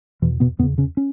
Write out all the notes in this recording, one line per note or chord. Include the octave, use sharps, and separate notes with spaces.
E2 B2 E3
B2 B3
E2 B2 C#3 B3
C#3 C#4
C#4